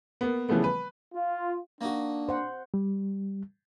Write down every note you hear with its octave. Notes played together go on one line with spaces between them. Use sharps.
A#3 B3
C#3 E3 F3 G3 A3 B3
B4
F4
A#3 D4 D#4 F#4
C5 F#5
G3